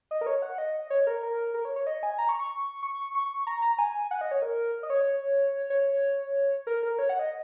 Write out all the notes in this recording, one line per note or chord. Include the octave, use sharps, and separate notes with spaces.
D#5
A#4
C#5
F#5
D#5
C#5
A#4
A#4
A#4
C#5
C#5
D#5
G#5
A#5
C#6
C#6
C#6
C#6
A#5
A#5
G#5
F#5
D#5
C#5
A#4
D#5
C#5
C#5
A#4
A#4
C#5
F#5
D#5